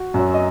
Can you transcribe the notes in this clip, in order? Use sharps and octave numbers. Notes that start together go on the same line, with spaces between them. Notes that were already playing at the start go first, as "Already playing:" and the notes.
Already playing: F#4
F#2 F#3
D#5